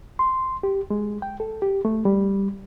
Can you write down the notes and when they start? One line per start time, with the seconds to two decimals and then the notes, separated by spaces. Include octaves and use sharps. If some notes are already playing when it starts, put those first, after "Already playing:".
0.19 C6
0.63 G4
0.90 G#3
1.22 G5
1.40 A4
1.62 G4
1.85 A3
2.05 G3